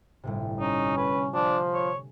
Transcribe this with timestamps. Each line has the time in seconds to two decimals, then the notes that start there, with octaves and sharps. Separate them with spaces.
0.24 G1 A2 C3
0.60 C#4 D#4
0.97 B4 G#5
1.34 F3 D4
1.74 C#5